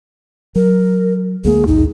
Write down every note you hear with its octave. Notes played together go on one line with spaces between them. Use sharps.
F#3 A#4
D2 G#3 A#3 G#4
A#1 D#2 G#2 D#4